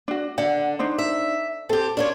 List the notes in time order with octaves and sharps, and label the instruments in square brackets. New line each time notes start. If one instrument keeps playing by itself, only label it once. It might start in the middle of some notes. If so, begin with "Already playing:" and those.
[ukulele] D4 F#4
[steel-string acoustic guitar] D3 [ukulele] F#5
[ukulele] D4 D#4 C5
[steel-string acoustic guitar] E5
[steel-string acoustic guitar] C4 G4 [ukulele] A4
[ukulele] C#4 [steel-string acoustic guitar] D4 F4 C#5